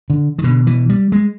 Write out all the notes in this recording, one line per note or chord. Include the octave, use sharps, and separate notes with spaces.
D3
D#3
B2 D3
E3
G3
G#3